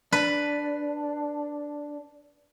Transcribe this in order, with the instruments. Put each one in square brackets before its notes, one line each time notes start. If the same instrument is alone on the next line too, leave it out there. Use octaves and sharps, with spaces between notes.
[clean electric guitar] D4 [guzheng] B4